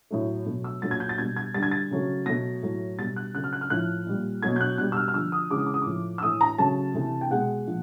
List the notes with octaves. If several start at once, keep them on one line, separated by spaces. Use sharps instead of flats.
A2 F#3 A3
B2 F#3 A3
E6
A#2 F#3 A3 A6
G#6
G6
A6
B2 G3 G#6
G#6
D3 G3 A6
G#6
A6
C#3 F#3 A3
B2 F#3 A3 A#6
A2 F#3 A3
B2 G3 A6
F#6
C#3 F#3 A3 F#6
F6
F#6
F6
A2 F3 A3 F#6
A#2 G3
B2 F#3 A3 G#6
G6
F#6
B2 G3 F#6
E6
F6
F6
D3 F3 A3 E6
D#6
C#3 E3 G#3 D6
D#6
D6
D#6
A2 F3 A3 D6
E6
A2 E3 A3 D#6
A#5
C#3 F#3 A3 A5
C3 E3 A3
G5
B2 G#3 F#5
A#2 F3